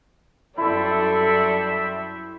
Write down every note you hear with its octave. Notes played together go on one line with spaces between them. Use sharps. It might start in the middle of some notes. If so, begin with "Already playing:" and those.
F#2 G3 E4 A4 C5 D5 E5 C#6